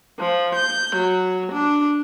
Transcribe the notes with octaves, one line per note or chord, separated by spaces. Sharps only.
F3
G6
F#3
D4